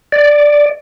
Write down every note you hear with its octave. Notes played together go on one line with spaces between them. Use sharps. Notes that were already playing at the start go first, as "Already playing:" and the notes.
D5